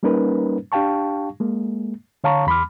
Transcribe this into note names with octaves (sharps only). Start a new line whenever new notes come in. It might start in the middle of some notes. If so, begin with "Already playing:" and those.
G3 A#3 C#4 D#4 A#4 B4
D4 G4 F5 G5 A5 C#6
G#3 A#3
D3 C#5 F5 A5 A#5 C#6
E2 B5 C6 D6 F6